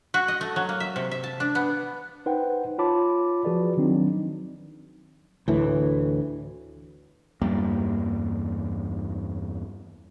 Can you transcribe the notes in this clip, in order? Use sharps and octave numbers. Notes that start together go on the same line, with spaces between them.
F#4
D#5
A3
F#3
A#3
E5
C3
E5
A5
D4
B3
D#4 B4 C5 F#5 G5
F4 C#5 A5 B5 D6
F3 F#4 G#4 B4 D5
D#3 F#3 C4 D4 D#4
D2 A2 E3
E2 G2 G3 A#3